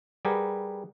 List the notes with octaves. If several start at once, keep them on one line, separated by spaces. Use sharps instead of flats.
G3 G4 G#4 A#4 B4 F#5